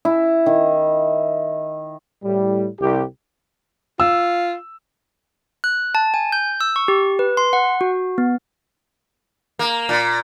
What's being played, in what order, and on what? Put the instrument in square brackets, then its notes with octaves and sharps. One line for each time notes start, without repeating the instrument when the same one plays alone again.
[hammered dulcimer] E4
D#3
[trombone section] A2 G3
C2 G4
[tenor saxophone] F4 [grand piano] E6
[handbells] F#6
A5
G#5
G6
E6
C#6
G4
B4
C6
F#5
F#4
B3
[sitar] A#3
A#2